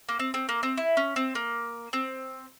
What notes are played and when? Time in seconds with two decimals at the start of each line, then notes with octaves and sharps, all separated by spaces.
0.09 A#3
0.19 C4
0.34 C4
0.49 A#3
0.63 C4
0.77 E4
0.97 C#4
1.16 C4
1.35 A#3
1.93 C4